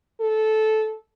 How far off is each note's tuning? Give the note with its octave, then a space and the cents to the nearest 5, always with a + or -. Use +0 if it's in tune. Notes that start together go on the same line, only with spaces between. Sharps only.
A4 -15